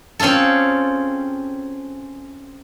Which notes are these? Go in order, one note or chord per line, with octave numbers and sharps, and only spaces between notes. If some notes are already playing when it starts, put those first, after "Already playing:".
C4 C#4 F4 G#4 A4